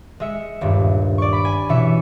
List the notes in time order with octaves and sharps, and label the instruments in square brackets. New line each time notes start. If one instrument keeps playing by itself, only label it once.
[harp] G#3 E5 C#7
D#1 G2
D5 C#6
B5 D7
G#5
B2 E3 C#4 E5 C#7